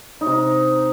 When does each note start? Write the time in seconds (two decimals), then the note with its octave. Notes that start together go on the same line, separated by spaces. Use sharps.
0.21 D#4
0.26 C3
0.32 D#4